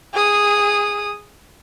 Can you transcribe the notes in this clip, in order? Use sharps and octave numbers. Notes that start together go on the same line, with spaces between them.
G#4 D#6